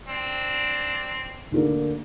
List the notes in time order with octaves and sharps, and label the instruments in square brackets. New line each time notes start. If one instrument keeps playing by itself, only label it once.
[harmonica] C4 D4
[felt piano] D2 D3 A#3